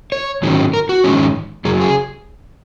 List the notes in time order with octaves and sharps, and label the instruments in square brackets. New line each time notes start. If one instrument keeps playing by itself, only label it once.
[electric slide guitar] C#5
G#2 D#3 F#3 C#4
A#4
F#4
G#2 D#3 G#3 C#4
F#2 C#3 F#3 G#4
G#4